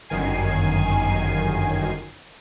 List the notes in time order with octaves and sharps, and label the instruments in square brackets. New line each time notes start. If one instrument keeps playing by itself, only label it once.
[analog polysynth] G1 F#2 D#3 G#5 C7